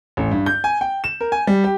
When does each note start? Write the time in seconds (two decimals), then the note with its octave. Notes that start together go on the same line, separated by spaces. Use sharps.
0.17 A1
0.31 G2
0.46 G6
0.64 G#5
0.81 G5
1.04 E7
1.21 A#4
1.32 G#5
1.47 G3
1.64 G4